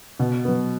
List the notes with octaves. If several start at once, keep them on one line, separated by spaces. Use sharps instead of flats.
B2
F#3 B3